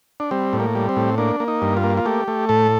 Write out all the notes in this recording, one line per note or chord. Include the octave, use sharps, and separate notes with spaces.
D4
G3 C4
A2
A#3
G3
C4
A2
A#3 D4
A#3
D#4
G2
F4
A#3
F4
A3 G4
A3
A2 A4